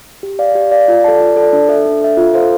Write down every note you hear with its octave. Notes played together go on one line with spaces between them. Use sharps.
G4
D5 F5
G4
D5 F5
F4
A4 D5 A5
F4
A4 D5 A5
D4
A4 E5
D4
A4 E5
F4
A4 C5 F5